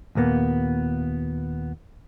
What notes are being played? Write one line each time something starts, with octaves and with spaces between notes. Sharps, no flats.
D#2 A#2 A#3 B3